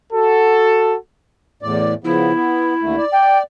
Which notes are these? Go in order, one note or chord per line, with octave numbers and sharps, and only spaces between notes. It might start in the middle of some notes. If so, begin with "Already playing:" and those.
F#4 A4
E2 A2 D5
C#3 F3 B3 E4
B3
D#2 D3 A3
D5
G5